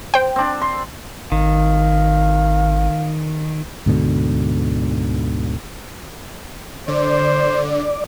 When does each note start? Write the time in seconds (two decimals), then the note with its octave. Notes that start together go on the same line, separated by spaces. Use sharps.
0.14 C5 G5
0.36 C4 D4
0.61 C6
1.32 G#1 D#3 F5
3.86 D2 G#2 B2 D3
6.88 D3 C5 D5